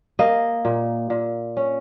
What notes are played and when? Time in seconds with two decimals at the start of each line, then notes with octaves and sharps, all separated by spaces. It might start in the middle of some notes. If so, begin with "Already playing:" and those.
0.19 A#3 D#5
0.65 A#2
1.10 A#2
1.57 C#4